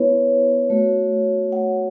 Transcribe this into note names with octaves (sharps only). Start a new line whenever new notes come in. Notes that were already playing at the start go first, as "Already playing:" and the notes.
Already playing: B3 E4 B4 C#5
A3 F#4
F#5